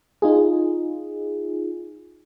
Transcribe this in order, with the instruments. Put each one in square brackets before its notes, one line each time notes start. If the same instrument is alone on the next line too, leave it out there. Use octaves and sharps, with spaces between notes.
[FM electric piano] D#4 F4 G#4